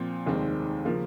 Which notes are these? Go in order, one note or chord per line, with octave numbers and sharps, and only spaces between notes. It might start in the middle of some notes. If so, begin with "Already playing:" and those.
Already playing: A#2 F3 C4
F1 D#2 D#3 G#3 C4
C#3 F3 A#3 F4